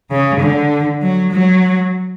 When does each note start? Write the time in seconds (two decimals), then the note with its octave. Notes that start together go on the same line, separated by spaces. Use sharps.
0.11 C#3
0.40 D3
1.02 F#3
1.32 F#3